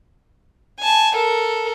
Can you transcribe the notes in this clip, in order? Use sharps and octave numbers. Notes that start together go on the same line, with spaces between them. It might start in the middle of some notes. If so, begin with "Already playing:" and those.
G#5 A5
A4 A#4